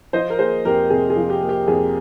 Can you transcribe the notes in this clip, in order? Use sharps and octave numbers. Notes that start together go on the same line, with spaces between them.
F3 C5 D#5
A#4
A#3 G#4 C5
F2 G4 A#4
C3 G#4
G#4
F3
G4
A#3
G4
F2 G#4